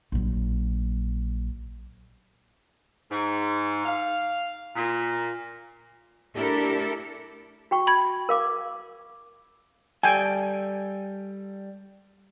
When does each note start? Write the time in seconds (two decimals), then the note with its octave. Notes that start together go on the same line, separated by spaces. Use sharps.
0.12 A#1 F#3
3.11 G#2
3.85 F5
4.75 A#2
6.35 A3 D4 E4 G4 A4 A#4
7.71 F#4 G5 C#6
7.87 B5 G#6
8.29 A#4 F5 D6
10.03 G3 A4 G5 G#5